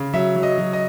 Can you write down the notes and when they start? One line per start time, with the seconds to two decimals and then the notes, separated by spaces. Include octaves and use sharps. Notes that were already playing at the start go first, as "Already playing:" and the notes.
Already playing: C#3
0.14 F#3 E5
0.36 F#3
0.43 D#5
0.58 F#3
0.73 D#5